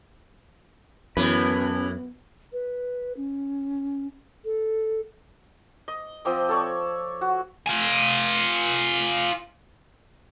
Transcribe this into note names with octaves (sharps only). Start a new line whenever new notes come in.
F#2 A2 E3 B3 C#4 B4
B4
C#4
A4
D#5
F3 C4 D#5 D6
A4 C#5 D5
F#4
F4 G#5